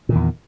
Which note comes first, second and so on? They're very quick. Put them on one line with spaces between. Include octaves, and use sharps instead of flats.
A#2 D#3 E2